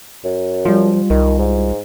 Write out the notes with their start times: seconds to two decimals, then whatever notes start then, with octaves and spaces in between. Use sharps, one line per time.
0.24 F#2
0.65 F3 G3 F4
1.10 C2 D#3
1.39 G#2